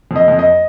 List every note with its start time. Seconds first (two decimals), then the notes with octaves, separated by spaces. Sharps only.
0.11 F2 D#5
0.28 F2
0.39 D#5